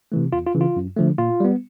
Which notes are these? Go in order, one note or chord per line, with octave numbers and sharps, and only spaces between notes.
C3 E3 A3
E2 F4
F4
C#3 E3
F4
F#2
D3 F3 A3
A#2 F4
G3 B3